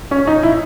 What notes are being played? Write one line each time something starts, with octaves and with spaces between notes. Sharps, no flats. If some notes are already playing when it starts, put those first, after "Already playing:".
C#4
D#4
E4